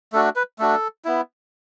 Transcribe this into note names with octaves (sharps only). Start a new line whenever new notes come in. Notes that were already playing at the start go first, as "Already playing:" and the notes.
A3 D4 F#4 A4
B4
A3 D4 F#4 A4
B3 E4